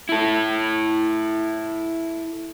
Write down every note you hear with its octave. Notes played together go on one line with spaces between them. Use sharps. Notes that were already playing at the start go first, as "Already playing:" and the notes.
E4 A4